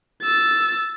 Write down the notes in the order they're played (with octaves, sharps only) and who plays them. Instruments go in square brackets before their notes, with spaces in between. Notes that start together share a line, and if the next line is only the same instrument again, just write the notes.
[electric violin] E6 A6